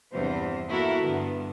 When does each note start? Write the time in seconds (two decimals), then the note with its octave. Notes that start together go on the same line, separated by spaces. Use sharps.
0.13 E2 G2 C3 E3 C5
0.68 A#3 B3 E4 F#4 A4 A#4
1.01 G2 D3 B3